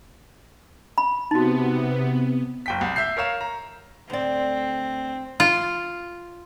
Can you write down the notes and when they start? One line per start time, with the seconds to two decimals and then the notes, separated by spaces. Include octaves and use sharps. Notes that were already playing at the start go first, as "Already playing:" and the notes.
0.98 B5
1.31 C3 B3 D#4 F#4
2.66 F#1 G5 B6
2.81 C2
2.96 E5 G6 C7
3.17 A#4 C#5 F5 E7
3.41 A#5
4.10 D2 C4 D5
5.40 F4